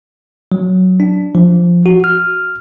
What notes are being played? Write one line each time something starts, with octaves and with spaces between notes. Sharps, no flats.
F#3
D4
F3
F#4
F6